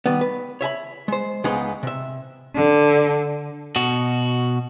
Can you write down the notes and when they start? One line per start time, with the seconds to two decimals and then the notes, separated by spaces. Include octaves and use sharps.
0.06 D#3 G3 B3
0.21 B4
0.61 C#5 E5 A5 B5
1.08 G#3 C5
1.44 C#2 G#3 B3 D#4 B4 C6
1.83 C3 E5
2.54 D3
3.76 B2 F#4